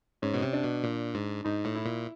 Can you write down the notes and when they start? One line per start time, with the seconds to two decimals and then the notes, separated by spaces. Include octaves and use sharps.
0.22 G#2 C#4
0.34 B2
0.42 C3
0.53 D4
0.64 B2
0.83 A#2
1.14 G#2
1.44 G#2 D#4
1.65 A2
1.75 E4
1.85 A#2